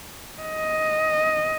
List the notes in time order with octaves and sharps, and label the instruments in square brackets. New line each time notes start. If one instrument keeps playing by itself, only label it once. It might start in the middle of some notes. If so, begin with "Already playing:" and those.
[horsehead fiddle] D#5